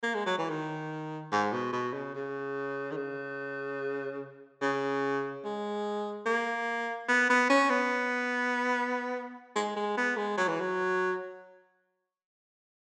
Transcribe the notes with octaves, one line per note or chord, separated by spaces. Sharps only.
A#3
G#3
F#3
E3
D#3
G#2
B2
B2
C#3
C#3
D#3
C#3
C#3
G#3
A#3
B3
B3
C#4
B3
G#3
G#3
B3
G#3
F#3
E3
F#3